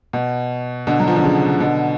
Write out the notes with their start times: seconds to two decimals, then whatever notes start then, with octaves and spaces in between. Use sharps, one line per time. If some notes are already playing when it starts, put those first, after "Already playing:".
0.13 B2
0.87 B2 D3
1.00 F#3
1.08 F3
1.16 D3
1.24 C#3
1.60 B2 D3